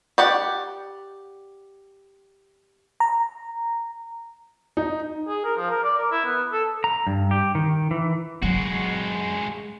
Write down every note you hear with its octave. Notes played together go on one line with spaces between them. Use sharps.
G4 D5 F#5
A#5
D#4
G#4
A#4
F3
A#4
D5
A#4
E4
B3
A4
A#5
G2
G4
D#3
E3
F#3 G#3 F#4